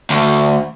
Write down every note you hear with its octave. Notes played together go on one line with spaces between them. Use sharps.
D2